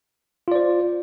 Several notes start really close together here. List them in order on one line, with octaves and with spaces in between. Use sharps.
F4 D5 C5